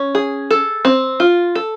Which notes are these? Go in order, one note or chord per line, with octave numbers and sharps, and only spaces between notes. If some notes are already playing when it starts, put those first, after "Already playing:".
Already playing: C#4
G#4
A4
C4
F4
A4